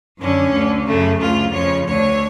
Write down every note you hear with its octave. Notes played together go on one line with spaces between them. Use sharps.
F#2 D3 C#4
D2 D3
F#2 C#3 A3
D2 C#3 F4
F2 C#3 C#5
D2 D3 C#5